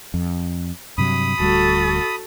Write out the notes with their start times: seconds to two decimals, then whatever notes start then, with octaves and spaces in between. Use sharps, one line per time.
0.14 F2
0.98 G2 C3 F#3 B5 D#6
1.39 D1 D2 G3 F#4 A4